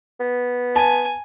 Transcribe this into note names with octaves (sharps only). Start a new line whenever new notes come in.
B3
G#5 A5